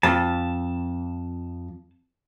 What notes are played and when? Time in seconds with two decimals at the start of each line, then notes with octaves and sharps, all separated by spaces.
0.03 F2 A5